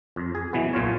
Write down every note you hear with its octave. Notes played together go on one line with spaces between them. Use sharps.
F2
G#4
B2 E3 F#3 B3
B1 A#2 F4 C#5